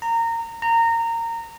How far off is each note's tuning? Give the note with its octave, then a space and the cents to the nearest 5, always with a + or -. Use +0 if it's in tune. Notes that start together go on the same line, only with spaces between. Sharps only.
A#5 -20
A#5 -20